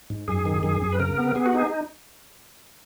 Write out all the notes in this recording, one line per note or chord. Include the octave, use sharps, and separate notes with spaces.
G#2
F#2 G#4
D#3
F#2 G#4
F#2
B4
C#3 A#4
B3
B3 G#4
F#4
D#4 G#4